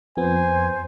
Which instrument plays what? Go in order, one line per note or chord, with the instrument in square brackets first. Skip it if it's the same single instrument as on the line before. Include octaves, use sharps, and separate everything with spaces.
[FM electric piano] F2 B3 [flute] C5 [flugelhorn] G#5